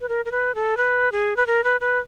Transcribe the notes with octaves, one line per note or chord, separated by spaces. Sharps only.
B4
A#4
A#4
B4
A4
B4
G#4
B4
A#4
B4
B4